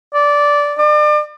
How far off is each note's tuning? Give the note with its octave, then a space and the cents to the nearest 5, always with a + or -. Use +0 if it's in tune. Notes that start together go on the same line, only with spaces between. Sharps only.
D5 -10
D5 +35